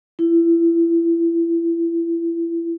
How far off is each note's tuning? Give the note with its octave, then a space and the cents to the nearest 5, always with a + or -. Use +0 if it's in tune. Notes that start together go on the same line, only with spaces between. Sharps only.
E4 +30